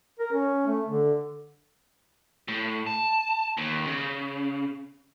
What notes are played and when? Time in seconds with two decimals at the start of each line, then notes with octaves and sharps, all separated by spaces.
0.19 A#4
0.32 C#4
0.67 A3
0.86 D3
2.48 A2
2.87 A5
3.57 D#2
3.87 C#3